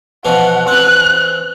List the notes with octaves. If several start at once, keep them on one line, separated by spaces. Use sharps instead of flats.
B2 E3 F3 F#5
E3 C4 F#6